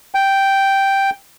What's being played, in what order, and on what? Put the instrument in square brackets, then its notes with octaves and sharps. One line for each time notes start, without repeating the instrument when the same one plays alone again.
[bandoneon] G5